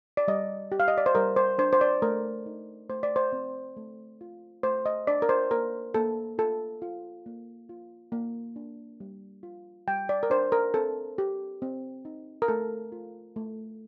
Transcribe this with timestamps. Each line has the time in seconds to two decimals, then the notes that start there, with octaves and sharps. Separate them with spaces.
0.17 D5
0.28 G3 D#5
0.72 G4
0.80 F5
0.88 D#5
0.98 D5
1.06 C5
1.15 G3 A#4
1.36 C5
1.58 D4 C5
1.73 C5
1.81 D5
2.02 A3 A#4
2.46 D#4
2.89 A3 C5
3.03 D5
3.16 C5
3.32 C4
3.77 A3
4.21 F4
4.63 A3 C5
4.86 D#5
5.07 D4 D5
5.22 A#4
5.29 C5
5.51 A#3 A#4
5.94 A#3 A4
6.38 F4 A4
6.82 F4
7.26 A#3
7.69 F4
8.12 A#3
8.56 D4
9.00 G3
9.43 F4
9.88 G3 G5
10.09 D5
10.23 A#4
10.30 D4 C5
10.52 A#4
10.74 C4 A4
11.18 G4
11.62 C4
12.05 D#4
12.42 A#4
12.48 A3 A4
12.92 F4
13.36 A3